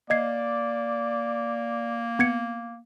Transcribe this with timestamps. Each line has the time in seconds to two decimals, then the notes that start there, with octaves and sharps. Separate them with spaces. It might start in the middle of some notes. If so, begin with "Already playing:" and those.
0.10 A#3 D5 D#5 G#6 C7
2.19 B3 G#6 C#7